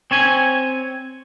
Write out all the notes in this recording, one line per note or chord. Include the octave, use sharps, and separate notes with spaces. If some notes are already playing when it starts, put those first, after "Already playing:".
C4 C#5 G#5